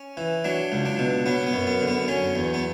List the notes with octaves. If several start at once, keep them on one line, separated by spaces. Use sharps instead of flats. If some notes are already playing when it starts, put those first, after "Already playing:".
Already playing: C#4
E3
F#3 D4
C#2
D4
B2
F#3 B3
B3
F#2
B3
D3
B3
F#3 C#4
E2
B3